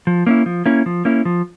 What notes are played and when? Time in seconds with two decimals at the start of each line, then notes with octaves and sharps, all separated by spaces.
0.07 F3
0.27 A#3 C#4 E4
0.46 F3
0.66 A#3 C#4 E4
0.86 F3
1.05 A#3 C#4 E4
1.25 F3